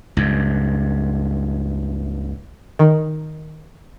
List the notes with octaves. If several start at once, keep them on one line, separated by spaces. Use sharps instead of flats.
C#2 G2
D#3